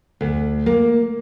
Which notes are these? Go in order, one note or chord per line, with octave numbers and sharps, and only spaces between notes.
D2
A#3